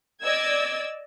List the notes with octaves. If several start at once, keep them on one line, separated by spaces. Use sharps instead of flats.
D5 D#5 E6 G#6